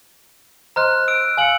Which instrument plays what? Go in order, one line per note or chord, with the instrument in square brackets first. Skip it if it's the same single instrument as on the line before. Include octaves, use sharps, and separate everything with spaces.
[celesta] C5 D#5 C6 [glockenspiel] A#5 F6 F#6
[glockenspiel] E6 D7
[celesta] F5 C#7 [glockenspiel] G#5 E6 F#7